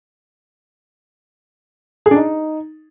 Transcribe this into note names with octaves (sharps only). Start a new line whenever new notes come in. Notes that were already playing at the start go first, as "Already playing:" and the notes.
G#4
D4
D#4